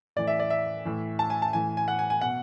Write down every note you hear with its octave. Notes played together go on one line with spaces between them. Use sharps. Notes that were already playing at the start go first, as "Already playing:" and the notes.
A2 E3 D5
E5
D5
E5
A2 E3
A5
G#5
A5
A2 E3 G#5
G#5
F#5
G#5
G#5
B2 F#5